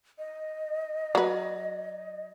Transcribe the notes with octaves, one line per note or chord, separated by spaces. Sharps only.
D#5
F#3 B4 D5